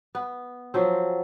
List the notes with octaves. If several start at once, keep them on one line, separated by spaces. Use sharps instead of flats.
B3
F3 F#3 C4